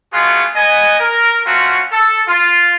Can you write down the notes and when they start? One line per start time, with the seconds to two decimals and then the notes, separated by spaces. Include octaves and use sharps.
0.13 G#3 A3 B3 F4 F#4 G#4
0.55 B3 D#5 G#5
0.99 A#4
1.45 A3 C4 C#4 F4 F#4
1.91 A4
2.28 F4